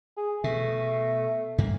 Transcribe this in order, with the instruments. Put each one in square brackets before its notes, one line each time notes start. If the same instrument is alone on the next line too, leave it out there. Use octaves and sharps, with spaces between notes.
[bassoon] G#4
[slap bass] B2 [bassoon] A3
[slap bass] G2 A#3